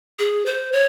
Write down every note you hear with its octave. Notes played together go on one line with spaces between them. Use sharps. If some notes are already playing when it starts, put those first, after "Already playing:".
G#4
C5
C#5